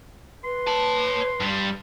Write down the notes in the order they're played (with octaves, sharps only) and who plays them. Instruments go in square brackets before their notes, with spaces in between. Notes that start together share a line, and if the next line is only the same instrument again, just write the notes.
[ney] B4 [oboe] C6
[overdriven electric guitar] C#5 A5
G2 G3